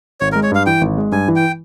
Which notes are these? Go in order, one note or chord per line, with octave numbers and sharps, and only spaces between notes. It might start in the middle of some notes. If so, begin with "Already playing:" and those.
G#1 C#5
A#4
G#3
C#5
G2 F5
E3 G5
G#1
G#3
G2 G#5
E3
G5